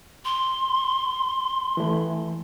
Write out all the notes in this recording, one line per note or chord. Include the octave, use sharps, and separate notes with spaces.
C6
E3 A3